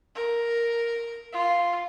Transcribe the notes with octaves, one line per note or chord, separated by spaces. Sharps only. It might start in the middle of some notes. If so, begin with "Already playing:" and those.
A#4
F4